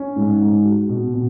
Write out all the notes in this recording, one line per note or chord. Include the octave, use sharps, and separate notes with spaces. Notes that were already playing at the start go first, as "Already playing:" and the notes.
Already playing: C#4
G#2
G#2
F#4
B2
B2